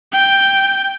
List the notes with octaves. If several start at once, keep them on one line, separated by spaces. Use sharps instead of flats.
G5